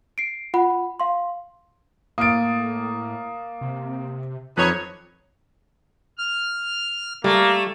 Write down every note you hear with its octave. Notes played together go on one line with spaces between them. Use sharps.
C7 D7
F4 F#5 B5
F5 C6
A2 A#3 D#6 F6 A6 D7
C3
F2 F3 D#4 B4 C#5
F6
G3 A3 A#3